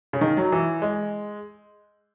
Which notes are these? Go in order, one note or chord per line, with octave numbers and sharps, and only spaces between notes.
C#3
D#3
F#3
E3
G#3